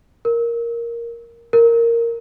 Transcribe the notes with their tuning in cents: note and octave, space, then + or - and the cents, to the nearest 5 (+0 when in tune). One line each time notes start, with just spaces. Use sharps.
A#4 +5
A#4 -5